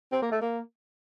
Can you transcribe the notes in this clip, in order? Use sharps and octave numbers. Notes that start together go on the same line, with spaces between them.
C4
A#3
A3
A#3